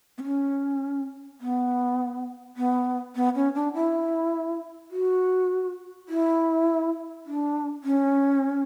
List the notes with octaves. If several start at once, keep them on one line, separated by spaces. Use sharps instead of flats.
B3
C#4
B3
B3
B3
C#4
D4
E4
F#4
E4
D4
C#4